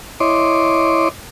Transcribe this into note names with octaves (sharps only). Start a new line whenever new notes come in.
E4 C#5 D#5 C6 D6